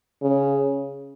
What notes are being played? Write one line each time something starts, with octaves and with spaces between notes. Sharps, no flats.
C#3